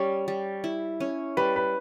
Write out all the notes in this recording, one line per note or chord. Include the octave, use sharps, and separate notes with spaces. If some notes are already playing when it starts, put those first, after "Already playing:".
Already playing: G3 C#4 C#5
G3
E4
C#4
G3 B4
B4